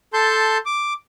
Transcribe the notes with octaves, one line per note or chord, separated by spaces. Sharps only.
A4 A5 C6 G6
D6